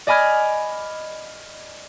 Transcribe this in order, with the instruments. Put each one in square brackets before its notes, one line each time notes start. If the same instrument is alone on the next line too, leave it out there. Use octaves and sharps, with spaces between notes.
[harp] D5 D#5 G#5 B5 F6 G#6